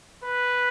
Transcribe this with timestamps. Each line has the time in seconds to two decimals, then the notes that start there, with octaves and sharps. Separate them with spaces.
0.24 B4